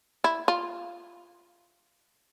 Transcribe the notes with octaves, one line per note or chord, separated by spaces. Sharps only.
E4
F4